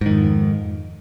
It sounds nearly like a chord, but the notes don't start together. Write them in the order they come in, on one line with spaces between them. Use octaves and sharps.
G#2 D#3 F2